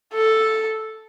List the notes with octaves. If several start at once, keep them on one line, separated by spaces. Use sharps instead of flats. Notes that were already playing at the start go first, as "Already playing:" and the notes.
A4